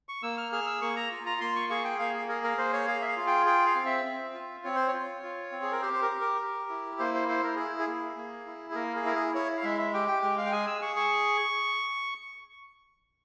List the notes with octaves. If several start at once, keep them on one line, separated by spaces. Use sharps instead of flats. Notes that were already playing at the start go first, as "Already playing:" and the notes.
C#6
A#3 E6
F6
G#4 F6
E6
A#3 C#6
A#5
F4
A#5
A#3 C6
C#6
G#4 C#6
G5
A#3 F5
G#4
G#4 A#4
A#4
A#3 C5
C#5
G#4 F5
E5
F5
F4
G5
G#4 G5
F5
C4
E5
C4
F4
C4 C#5
C5
C#5
F4
F4
C4
G#4
A#4
G4 C5
C5
A#4
G4
A#4
G4
E4
A#3 C5
C5
E4 C5
A#4
E4 G#4
G#4
A#3
A#3
E4
G#4
A#3 A#4
G#4
E4 A#4
G#4
E4 C#5
F5
G#3 E5
E5
G4 G5
G5
G#3 G5
F5
G5
G#4 G#5
E6
G#4 C#6
C#6